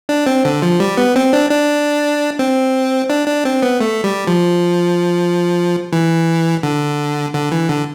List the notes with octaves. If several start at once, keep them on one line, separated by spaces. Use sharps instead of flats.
D4
C4
D3
F3
G3
B3
C4
D4
D4
C4
D4
D4
C4
B3
A3
G3
F3
E3
D3
D3
E3
D3